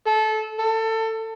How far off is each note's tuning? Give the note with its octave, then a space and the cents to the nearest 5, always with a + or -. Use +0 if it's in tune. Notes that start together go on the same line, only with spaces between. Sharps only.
A4 -20
A4 +25